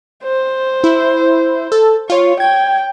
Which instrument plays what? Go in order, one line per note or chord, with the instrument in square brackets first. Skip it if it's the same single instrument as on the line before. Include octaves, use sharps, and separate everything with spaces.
[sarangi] C5
[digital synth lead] E4
A4
[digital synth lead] F4 [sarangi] C#5
[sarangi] G5 [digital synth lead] G#6